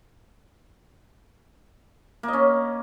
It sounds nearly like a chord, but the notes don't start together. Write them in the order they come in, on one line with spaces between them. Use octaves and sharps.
A#3 D#5 C#4